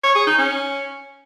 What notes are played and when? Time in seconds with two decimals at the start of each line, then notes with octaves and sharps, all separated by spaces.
0.03 C#5
0.15 G#4
0.27 D#4
0.39 C#4